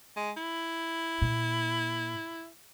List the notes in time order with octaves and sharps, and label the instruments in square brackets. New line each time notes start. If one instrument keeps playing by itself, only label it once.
[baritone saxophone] G#3
E4
[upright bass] A#2